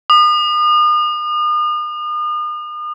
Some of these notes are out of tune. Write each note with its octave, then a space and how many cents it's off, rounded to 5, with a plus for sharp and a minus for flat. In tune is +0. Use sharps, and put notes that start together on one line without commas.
D#6 -40